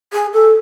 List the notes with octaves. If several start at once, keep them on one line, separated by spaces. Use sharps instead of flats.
G#4
A4